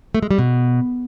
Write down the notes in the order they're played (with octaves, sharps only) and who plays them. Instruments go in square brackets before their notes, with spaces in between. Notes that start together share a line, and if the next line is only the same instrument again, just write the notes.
[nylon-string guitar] A3
G#3
G3
B2